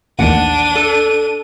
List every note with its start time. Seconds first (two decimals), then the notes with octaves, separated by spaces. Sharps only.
0.19 A1 D#2 D4 F#5 D#7
0.75 A4